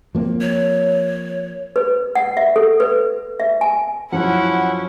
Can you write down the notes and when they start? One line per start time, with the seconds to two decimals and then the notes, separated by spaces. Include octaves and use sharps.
0.15 F3 A#3 C4
0.41 C#5
1.76 B4
2.15 F#5
2.37 E5
2.56 A4
2.80 B4
3.40 E5
3.61 G#5
4.12 F#2 F3 C#4 E4 F#5